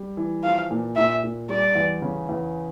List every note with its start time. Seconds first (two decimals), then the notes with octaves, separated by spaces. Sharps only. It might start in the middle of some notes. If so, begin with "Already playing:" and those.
Already playing: G3
0.17 E3
0.44 F3 F5
0.71 A#2
0.96 A#2 E5
1.24 A#2
1.49 G3 D5
1.75 E2
2.02 C#3
2.29 E2